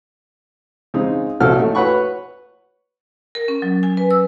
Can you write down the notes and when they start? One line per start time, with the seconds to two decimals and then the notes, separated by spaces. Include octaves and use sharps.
0.94 C#3 G#3 C4 D#4
1.40 C2 A#2 C#4 F#4 A4 F6
1.56 A3 D#4
1.75 F#4 B4 C#5 F#5 B5 C#6
3.35 A#4
3.48 C#4
3.62 F#3
3.83 G#5
3.97 B4
4.11 E6